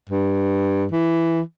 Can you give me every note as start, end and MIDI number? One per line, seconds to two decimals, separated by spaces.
0.09 0.86 43
0.92 1.41 52